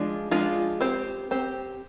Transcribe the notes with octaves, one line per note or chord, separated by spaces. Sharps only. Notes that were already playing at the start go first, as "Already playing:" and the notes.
Already playing: F3 G#3 D4 F4
F3 G#3 D4 F4
C4 G4 C5
C4 G4 C5